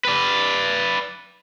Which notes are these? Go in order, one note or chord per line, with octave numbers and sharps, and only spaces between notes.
B4 D5